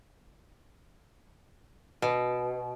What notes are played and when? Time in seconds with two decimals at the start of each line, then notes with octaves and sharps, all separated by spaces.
2.02 B2